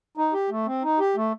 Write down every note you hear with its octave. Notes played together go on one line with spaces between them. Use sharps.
D#4
G4
A3
C4
D#4
G4
A3